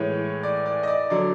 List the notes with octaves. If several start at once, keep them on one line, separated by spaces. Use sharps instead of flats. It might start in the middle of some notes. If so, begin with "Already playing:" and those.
Already playing: A2 E3 G#3 C#5
D5
D5
D#5
D5
D3 F#3 D5